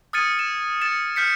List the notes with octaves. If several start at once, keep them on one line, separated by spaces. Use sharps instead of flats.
D#6 F6 G#6 A6 C#7 D#7
E7
A6 C#7 E7
F6 G6 B6 C#7